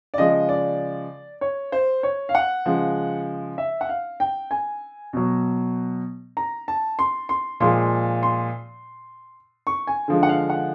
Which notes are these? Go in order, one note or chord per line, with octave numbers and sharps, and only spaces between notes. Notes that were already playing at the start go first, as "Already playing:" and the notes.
D5
C#3 F3 G#3 D#5
D5
C#5
C5
C#5
F5
F#5
C#3 F3 G#3
E5
F#5
F5
G5
G#5
B2 F#3
A#5
A5
C6
C6
A#2 F3 G#3 C6
C6
C#6
G#5
D3 F3 G#3
F#5
F5
F#5